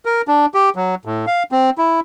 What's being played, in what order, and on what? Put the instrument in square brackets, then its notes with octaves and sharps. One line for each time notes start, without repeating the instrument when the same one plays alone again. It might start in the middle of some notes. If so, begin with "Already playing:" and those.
[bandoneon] A#4
D4
G4
F#3
A2
F5
C4
E4